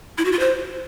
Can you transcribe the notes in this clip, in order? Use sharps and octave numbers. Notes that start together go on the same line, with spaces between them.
E4
F#4
F4
C5